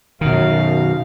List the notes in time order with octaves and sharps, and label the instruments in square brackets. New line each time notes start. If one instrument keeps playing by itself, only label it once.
[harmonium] F#2 F5 [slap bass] B2 D#3